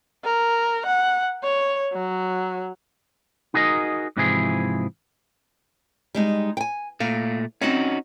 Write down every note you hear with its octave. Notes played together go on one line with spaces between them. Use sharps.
A#4
F#5
C#5
F#3
D#4 F#4 G#4 A#4 D#5
G#2 C3 E3 F3 E4 G#4
G3 G#3 D#4
G5 G#5
A#2 A3 F5
C4 C#4 D#4 F#4 F#5